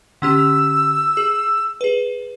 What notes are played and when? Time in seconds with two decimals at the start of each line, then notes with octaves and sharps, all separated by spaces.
0.22 D3 C#4 G4 E6
1.17 G#4
1.81 G#4 B4